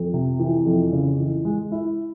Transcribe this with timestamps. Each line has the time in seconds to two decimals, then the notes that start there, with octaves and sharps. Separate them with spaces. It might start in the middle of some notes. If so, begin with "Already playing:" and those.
Already playing: F2
0.14 C3
0.39 E3
0.65 F2
0.92 C#3
1.19 E3
1.45 G#3
1.72 E4